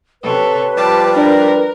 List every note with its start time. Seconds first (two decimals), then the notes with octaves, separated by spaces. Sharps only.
0.22 C3 A4 B4 C#5
0.77 F3 G3 A5 D6
1.16 D4 A#4 D5